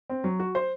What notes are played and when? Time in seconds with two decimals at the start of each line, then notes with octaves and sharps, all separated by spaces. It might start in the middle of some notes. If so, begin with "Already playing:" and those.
0.10 C4
0.24 F#3
0.40 F#4
0.55 C5